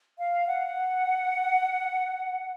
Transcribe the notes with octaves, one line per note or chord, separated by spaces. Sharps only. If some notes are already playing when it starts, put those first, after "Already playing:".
F5
F#5